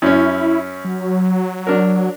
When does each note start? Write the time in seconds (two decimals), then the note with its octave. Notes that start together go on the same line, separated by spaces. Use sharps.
0.02 F#2 C#4 E4
0.84 F#3
1.67 D4 A#4